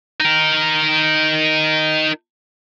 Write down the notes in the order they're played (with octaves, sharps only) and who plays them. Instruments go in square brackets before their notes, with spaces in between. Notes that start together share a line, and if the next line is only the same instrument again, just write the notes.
[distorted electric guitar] D#4 A#4